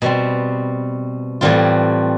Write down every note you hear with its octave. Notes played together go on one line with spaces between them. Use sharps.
B2 G3 C4
A2 E3 G3 C4 F4